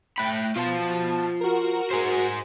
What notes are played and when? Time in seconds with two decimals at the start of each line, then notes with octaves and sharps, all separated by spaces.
0.18 A3 G5 B5 F#6 D7
0.56 B2 F4 C5 A5
1.41 F#4 A#4
1.91 G#4 C5